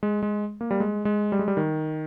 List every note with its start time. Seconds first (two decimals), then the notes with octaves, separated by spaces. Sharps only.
0.03 G#3
0.23 G#3
0.61 A#3
0.71 G3
0.80 G#3
1.05 G#3
1.32 G3
1.39 G#3
1.48 G3
1.57 D#3